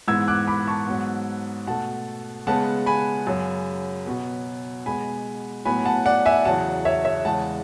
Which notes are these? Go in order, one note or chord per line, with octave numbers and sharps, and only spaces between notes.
G#2 E3 B3 E6 G#6
D6 F#6
B5 D6
A5 C#6
G#2 F#3 B3
B2 A3 F#5 A5
C#3 G#3 B3 F#5 A5
G#5 B5
F#2 C#3 F#3
B2 F#3 B3
B2 G#3 B3 G#5 B5
A2 F#3 B3 G#5 B5
F#5 A5
D5 F#5
E5 G#5
E2 C#3 F#3 F#5 A5
C#5 E5
C#5 E5
E2 C#3 G#3 F#5 A5